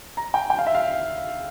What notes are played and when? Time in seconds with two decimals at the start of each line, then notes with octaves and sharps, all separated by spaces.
0.17 A#5
0.34 G5
0.50 G5
0.58 F5
0.67 E5
0.75 F5